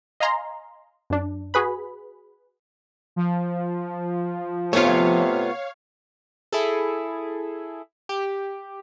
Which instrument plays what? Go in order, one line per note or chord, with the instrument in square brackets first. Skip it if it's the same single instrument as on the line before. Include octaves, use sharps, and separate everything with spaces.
[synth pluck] D#5 F5 G#5 A#5 C6
F#2 D4
F#4 G#4 B4 B5
[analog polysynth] F3
[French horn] C3 [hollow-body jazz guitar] A3 B3 F4 [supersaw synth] C#5 F5
[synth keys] E4 G#4 A4
G4